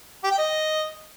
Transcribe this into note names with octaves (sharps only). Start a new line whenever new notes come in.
G4
G5
D#5